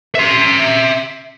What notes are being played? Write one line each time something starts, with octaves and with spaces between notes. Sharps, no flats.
E5 C6